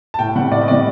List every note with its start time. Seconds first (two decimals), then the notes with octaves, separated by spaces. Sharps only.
0.14 A5
0.19 A2 G5
0.35 G3 C4 F#5
0.51 A2 D5
0.62 D#5
0.68 G3 C4 D5